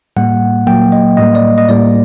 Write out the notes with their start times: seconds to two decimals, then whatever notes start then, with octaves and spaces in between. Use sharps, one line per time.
0.17 A2 G3 A#3 F#5
0.67 A#2 F#3 A#3 G5
0.92 D#5
1.17 A2 G3 A#3 D#5
1.35 D5
1.58 D#5
1.68 A2 G3 A#3 D5